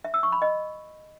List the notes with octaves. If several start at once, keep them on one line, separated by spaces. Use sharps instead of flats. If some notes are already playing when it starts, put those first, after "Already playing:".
E5
E6
C#6
B5
D#5